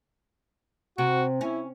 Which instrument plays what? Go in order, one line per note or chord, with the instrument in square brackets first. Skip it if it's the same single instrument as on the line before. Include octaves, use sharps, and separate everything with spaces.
[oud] C3 [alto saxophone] F#4
[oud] C#4 [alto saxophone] E4